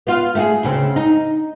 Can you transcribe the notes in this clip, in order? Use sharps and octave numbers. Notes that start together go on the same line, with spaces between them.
B3 F4
A3 F#4 G#4
D2 C#3 C4
D#4